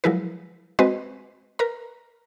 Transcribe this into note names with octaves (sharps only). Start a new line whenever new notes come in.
F3 F#3 G#3 E4 A#4 B4
G#3 C4 F#4 B4 C5 D#5
A#4 B4 A#5